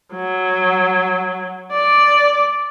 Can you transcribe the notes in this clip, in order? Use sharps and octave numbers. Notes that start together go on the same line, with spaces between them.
F#3
D5